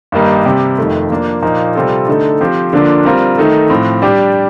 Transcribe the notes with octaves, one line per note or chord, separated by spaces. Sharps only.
G2 D#3 G3 A#3 D#4
C3 G3 C4 G4
F2 D#3 A3
F3 A#3 D4
A#2 F3 A#3 D#4
C3 G3 C4 F4 A4
D3 A3 D#4 A4
F3 C4 G4 C5
D3 F3 A#3 D4 F4
G3 C4 F4 A#4
D#3 A3 D#4 A4
A2 F3 C4
G3 D4 G4